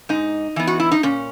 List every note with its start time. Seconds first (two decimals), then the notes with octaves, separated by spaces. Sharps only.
0.09 G#2 D#4
0.56 E3 B3
0.67 F#4
0.80 E4
0.91 D#4
1.03 A#2 C#4